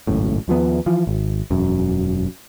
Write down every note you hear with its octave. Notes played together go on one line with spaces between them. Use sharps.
G#1 C#2 F#2 A2
D#2 F3 G#3 B3
E3 F3
G#1
E1 F#2